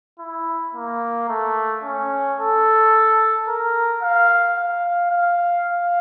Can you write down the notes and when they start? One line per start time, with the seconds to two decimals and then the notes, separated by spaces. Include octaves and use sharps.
0.19 E4
0.75 A#3
1.29 A3
1.84 C#4
2.38 A4
3.48 A#4
4.02 F5
4.57 F5
5.11 F5
5.66 F5